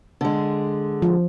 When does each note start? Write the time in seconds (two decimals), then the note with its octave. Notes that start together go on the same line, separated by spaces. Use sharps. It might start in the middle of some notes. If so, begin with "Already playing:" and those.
0.21 D3 G#3
1.02 F3